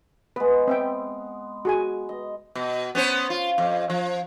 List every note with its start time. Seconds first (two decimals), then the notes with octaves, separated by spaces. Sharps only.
0.36 G#3 B3 B4
0.68 C4 E5 G5
1.65 F#4 G#4 G#5
2.09 D#5
2.55 B2
2.95 B3 C#4 C5
3.30 F4
3.58 F2
3.90 F3